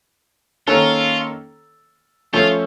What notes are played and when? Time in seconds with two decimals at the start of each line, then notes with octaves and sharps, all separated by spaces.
0.67 D#3 A#3 C#4 F4 A4 C#5
2.33 F3 A3 C#4 F4 A4 C#5